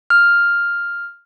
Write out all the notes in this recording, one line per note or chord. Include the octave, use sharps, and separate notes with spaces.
F6